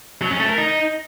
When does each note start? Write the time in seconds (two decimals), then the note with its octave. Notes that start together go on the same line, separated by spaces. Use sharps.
0.22 F#3
0.31 C#4
0.40 A3
0.49 A#4
0.58 D#4